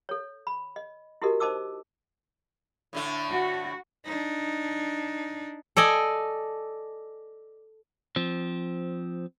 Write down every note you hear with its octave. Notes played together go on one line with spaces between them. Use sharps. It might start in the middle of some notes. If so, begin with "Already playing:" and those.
A4 C#5
B5
D#5
E4 F#4 G4 A4 A#4 D#5
D#4 C5 D#5 A5 D6 E6
A2 D3 A3
F#4
D4 D#4
A4 D5 D#5 G#5
F3 C4